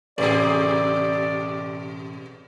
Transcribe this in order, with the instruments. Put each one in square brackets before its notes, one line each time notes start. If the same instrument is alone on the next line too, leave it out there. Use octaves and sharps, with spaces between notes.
[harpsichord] A1 [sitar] B2 G4 G#4 [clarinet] D5